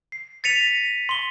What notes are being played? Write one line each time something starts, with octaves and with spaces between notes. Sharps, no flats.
C7
A6 B6 C#7 D#7 F7
A#6
C6 G7